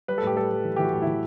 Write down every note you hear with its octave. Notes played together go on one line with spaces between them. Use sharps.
G3 B4
A4
A2 G4
G3 A4
G3
E3
G4
E3 F#4
A2
E3 E4